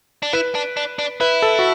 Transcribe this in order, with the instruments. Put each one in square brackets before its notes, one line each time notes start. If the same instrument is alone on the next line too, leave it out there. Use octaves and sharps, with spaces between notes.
[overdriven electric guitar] D4
[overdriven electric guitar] E4 [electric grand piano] B4
[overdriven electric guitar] D4
D4
D4
[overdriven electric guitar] E4 [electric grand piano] B4
[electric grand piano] A4
F#4